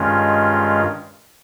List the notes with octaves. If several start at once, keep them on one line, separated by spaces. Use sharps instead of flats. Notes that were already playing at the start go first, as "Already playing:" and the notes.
Already playing: G2 D#3 G#3 C#4 F4